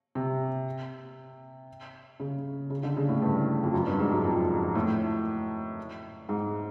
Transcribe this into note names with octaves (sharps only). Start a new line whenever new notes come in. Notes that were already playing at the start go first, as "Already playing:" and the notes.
C3
C#3
C#3
D3
C#3
A2
G2
F2
F#2
G2
G#2
F#2
F2
A2
G#2